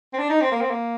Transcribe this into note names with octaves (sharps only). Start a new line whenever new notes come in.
C4
D4
D#4
C4
A#3
C4
A#3